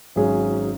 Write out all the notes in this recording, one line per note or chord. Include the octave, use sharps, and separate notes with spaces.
G#1 G#2 F#3 C#4 G#4